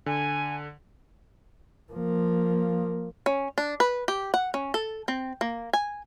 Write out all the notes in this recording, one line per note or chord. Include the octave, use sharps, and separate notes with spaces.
D3 G#5
F3 A#3
C#4
D4
B4
G4
F#5
C#4
A4
C4
A#3
G#5